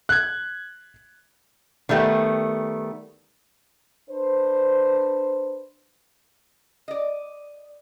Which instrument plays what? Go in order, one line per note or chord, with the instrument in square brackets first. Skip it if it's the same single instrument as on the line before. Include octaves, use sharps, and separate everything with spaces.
[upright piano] F#6 G#6
[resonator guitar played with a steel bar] D#3 G3 A3 B3
[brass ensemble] D4 B4 C5
[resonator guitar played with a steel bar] D5 D#5